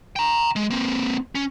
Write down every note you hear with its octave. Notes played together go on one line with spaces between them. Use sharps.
G5 A#5
G#3
A#3 C4
C#4